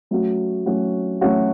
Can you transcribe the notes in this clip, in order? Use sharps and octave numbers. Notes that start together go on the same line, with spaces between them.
F#3 A3 C#4 F#4
F#3 A3 C#4 F#4
F#3 A3 C#4 F#4